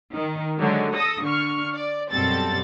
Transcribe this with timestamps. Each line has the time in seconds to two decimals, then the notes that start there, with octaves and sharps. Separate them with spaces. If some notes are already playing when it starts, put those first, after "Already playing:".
0.13 D#3
0.59 D3 F#3 G#3
0.93 A4 D#6 A#6
1.24 D3 C#6 F6
1.74 D5
2.11 F#2 B2 G3 C4 A4 A6